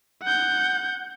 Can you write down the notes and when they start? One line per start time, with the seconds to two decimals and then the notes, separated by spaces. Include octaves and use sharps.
0.23 F#5 G6